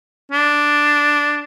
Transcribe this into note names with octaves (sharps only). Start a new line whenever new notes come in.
D4